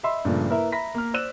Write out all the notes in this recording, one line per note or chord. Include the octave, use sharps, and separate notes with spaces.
D#5 E5 B5 C6 E6
G2 A#2 C#3 F3 A3
A#3 E4 A#4 B4 E5
E5 A#5 B5 A#6 B6
A#3 F6
C5 D5 E6 F#6 E7